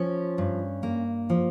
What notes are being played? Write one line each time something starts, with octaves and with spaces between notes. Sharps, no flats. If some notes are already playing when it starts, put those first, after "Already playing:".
Already playing: F3 C#4
G2
A#3
F3